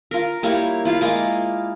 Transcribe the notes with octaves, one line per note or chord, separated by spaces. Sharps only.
F4 A#4
G3 A#3 E4 C#5
E4 F4 F5
G#3 A#3 D6